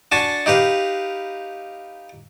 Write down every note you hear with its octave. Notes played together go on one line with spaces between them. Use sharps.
D4 F#4 G#5 A5
D#4 G4 B4 F5